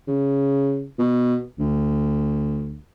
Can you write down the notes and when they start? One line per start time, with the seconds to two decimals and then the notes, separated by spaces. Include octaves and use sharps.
0.08 C#3
0.99 B2
1.59 D2